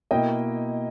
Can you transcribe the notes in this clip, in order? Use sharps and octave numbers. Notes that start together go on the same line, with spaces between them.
B2 A#3 E4 A#4 D#5 G5